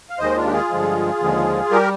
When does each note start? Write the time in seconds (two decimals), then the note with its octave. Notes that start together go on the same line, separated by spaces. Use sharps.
0.10 F5
0.19 D#2 D#3 G#3 C5 D#5
0.36 D4 F4
0.47 G4
0.52 F4 G#4
0.70 G2 D3 F3 G#3
1.20 D#2 D3 F3 G#3
1.71 G3 G4 A#4